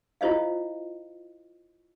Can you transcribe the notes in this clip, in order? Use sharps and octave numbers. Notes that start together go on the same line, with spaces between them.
E4 F4 C5 D#5 F5